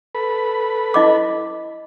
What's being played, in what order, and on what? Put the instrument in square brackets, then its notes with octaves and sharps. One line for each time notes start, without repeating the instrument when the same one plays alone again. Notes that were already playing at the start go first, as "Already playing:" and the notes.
[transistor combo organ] A4 B4 B5
[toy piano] E4 D#5 D6